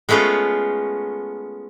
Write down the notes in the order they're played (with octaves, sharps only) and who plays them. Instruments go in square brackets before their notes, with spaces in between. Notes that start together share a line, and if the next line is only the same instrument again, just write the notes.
[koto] G#3 A3 B3 C#4 F4